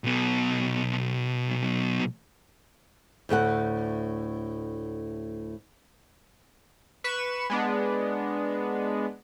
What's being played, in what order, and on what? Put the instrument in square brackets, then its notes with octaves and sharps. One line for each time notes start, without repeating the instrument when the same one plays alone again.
[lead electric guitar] B1 B2
[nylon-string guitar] D2 A2 A4 F#5
[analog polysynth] B4 C#6 E7
G#3 B3 D4